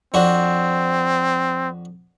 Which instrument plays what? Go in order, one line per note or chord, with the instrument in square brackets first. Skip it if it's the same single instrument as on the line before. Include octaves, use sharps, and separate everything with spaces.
[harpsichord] F2 D4 F#4 [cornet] C4